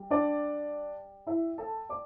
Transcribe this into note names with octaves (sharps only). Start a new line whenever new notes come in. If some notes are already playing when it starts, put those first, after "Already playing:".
Already playing: G3
D4 D5
E4 E5
A4 A5
D5 D6